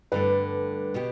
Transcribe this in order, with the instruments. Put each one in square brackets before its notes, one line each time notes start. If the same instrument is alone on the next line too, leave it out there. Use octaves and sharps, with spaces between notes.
[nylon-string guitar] G2 D3 A3 [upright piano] B4
[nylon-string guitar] B2 B3 G4